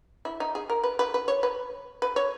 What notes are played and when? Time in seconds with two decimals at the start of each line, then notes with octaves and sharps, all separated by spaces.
0.25 E4
0.40 D#4
0.55 G#4
0.70 A#4
0.84 B4
0.99 B4
1.14 B4
1.28 C#5
1.43 B4
2.02 B4
2.16 C#5